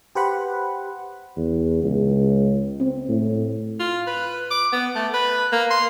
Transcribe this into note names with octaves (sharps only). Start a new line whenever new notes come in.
G4 B4 C5 F#5 B5
E2
C#2
C4
A2
F4
B4
D6
B3
A3
B4
A#3
C6